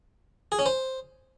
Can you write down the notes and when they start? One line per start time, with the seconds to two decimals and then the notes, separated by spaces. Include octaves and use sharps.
0.52 G#4
0.59 C#4
0.66 C5